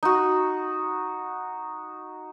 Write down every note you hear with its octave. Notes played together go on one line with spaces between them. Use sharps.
D#4 F#4